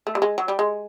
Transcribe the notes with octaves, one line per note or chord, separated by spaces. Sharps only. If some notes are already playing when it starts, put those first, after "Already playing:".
A3
G3
G#3
F#3
G3
G#3